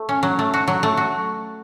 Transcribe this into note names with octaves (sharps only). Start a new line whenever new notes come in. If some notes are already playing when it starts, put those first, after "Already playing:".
Already playing: A3
C#4
F#3
A3
F#4
F#3
A3
F#4